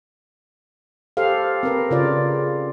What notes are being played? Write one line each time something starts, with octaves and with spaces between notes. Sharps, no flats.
G4 A4 C5 F5
C4 A#4 B4
C#3 F4 D5